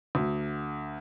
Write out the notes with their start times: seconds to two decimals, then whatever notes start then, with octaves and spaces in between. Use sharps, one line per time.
0.15 D2